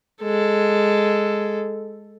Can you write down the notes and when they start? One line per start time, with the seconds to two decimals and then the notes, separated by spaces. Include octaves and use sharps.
0.23 G#3 A4